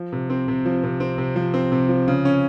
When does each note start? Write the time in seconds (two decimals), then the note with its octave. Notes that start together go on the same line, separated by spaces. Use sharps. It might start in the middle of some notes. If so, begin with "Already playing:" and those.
Already playing: F3
0.13 C3
0.30 C4
0.48 C3
0.66 F3
0.84 C3
1.00 C4
1.18 C3
1.36 F3
1.54 C4
1.72 C3
1.89 F3
2.08 C#3
2.25 C#4